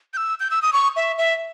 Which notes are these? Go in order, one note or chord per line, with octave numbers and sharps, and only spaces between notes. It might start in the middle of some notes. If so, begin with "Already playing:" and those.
G6
E6
G6
E6
D#6
C#6
E5
E5